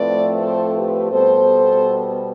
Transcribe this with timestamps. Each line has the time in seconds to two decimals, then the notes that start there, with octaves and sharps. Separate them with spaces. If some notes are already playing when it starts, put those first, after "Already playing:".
Already playing: A2 F3 A3 C4 B4 D5
0.39 A4 C5
0.74 G4 B4
1.11 B2 G3 B3 A4 C5